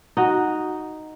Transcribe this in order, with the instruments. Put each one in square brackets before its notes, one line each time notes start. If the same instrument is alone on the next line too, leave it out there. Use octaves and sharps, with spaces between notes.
[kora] D#4 F#4